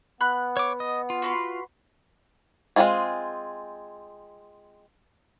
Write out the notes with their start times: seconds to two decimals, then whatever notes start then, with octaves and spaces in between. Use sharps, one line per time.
0.21 B3 B5 F#6
0.57 C#5 D6
0.80 D#5
1.10 F4
1.22 F#4 B4 C6
2.76 G#3 B3 C4 F4 G#4